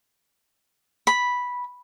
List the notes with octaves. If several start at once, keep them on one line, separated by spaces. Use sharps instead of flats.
B5